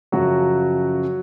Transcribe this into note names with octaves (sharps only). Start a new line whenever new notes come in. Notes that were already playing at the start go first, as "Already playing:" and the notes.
F#2 C#3 F3 F#3 F#4